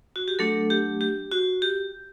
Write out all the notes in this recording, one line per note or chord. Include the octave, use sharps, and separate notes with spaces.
F#4
G4
F#3 A3 D4 A4
G4
G4
F#4
G4